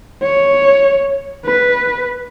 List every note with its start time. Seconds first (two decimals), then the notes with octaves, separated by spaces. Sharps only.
0.23 C#5
1.46 B4